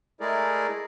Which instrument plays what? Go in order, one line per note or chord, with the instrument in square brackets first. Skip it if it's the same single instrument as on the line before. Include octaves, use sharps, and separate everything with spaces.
[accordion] G#3 A3 E4 G#4 A#4 D5